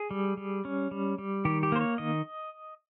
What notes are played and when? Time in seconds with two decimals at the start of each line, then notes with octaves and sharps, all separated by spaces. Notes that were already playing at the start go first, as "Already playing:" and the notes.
Already playing: G#4
0.11 G3
0.37 G3
0.65 C#4
0.91 G3
1.18 G3
1.45 D#3 G4
1.63 G4
1.72 A#3 C5
1.81 C#5
1.98 D#3 D#5